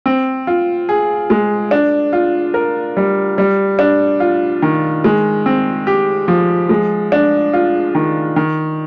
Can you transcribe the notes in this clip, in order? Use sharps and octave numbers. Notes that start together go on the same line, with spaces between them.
C4
F4
G#4
G#3
D4
F4
A#4
G3
G3
D4
F4
D#3
G#3
C4
G4
F3
G#3
D4
F4
D#3
D#3